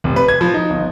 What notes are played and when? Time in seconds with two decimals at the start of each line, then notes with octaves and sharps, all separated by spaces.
0.04 F1
0.16 B4
0.28 G#6
0.41 F3
0.54 D#4
0.70 G1